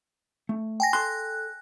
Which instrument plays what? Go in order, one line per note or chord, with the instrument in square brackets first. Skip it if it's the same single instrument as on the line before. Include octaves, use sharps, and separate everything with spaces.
[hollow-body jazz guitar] A3
[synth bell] G5 G#5 A#6
[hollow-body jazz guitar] A4 C6 [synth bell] F#6